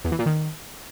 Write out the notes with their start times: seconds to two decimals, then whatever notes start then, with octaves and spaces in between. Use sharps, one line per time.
0.05 E2
0.12 E3
0.19 A#2
0.26 D#3